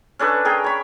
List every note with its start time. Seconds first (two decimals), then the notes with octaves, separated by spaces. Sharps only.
0.19 C#4 D4 A4 B4
0.45 G#4 A#4 G5
0.64 C#5 B5